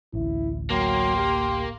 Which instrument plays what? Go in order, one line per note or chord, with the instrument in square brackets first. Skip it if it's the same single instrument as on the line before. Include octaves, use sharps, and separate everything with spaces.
[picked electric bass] A1 D2 [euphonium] E4
[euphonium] F#3 [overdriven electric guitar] A#3 [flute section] G5 C6
[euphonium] G4